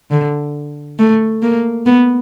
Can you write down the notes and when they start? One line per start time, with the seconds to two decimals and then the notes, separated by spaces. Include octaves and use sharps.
0.11 D3
0.99 A3
1.42 A#3
1.86 B3